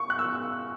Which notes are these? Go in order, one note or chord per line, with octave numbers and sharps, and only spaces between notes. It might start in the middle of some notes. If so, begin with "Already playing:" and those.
Already playing: C#6
F#6
E6